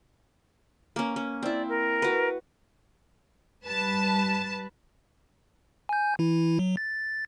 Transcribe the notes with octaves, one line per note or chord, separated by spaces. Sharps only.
A#3 C#4
C#4
C4 E4 D5
A#4
F#4 B4
G3 B4 A5
G#5 G6
E3 E4
F#3
A6